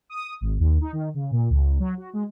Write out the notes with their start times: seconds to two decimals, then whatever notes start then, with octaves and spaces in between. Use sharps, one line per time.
0.10 D#6
0.41 G#1
0.59 D#2
0.81 D#4
0.93 D#3
1.14 C#3
1.31 A#2
1.50 C#2
1.80 F#3
1.98 F#4
2.13 G#3